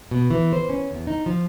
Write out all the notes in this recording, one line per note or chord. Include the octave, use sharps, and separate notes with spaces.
B2
E3
C5
C#4
E2
D#4
F3